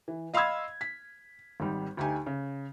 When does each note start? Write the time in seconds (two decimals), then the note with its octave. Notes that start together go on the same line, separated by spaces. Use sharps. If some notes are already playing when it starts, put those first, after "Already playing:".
0.08 E3
0.34 D#5 F5 B5 C6 E6 G#6
0.81 B6
1.60 G#1 D#3 G3
1.97 D2 D#4 G4 G#5
2.26 C#3